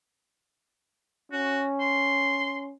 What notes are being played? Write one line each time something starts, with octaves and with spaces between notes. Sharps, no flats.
C#4 F#4
C6